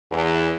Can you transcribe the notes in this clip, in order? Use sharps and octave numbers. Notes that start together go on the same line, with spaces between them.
E2